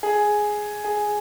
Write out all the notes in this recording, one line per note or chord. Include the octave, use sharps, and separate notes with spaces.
G#4
G#4